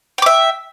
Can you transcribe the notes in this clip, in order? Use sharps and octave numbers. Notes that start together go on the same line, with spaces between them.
E5 G5 D6